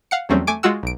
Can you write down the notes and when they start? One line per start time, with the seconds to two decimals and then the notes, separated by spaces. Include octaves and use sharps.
0.11 F5 F#5 C#7
0.29 E2 F#3 G3 A3 C4 C#4
0.47 A3 G#5 D6 D7
0.63 G#3 F4 F#4 F#5 E6
0.83 B1 D7